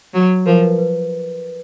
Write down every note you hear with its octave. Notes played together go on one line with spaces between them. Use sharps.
F#3
F3 A#4
B4
B4